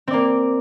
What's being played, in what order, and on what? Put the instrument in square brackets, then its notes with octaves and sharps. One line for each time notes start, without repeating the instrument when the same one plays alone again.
[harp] C4
D5
A#3